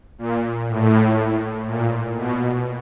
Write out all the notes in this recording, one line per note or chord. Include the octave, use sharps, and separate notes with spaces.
A#2
A2
A#2
B2